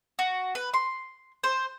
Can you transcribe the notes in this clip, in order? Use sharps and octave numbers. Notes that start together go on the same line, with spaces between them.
F#4
B4
C6
C5